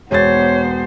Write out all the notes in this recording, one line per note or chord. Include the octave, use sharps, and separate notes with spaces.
E1 B3 C5 C#5 A6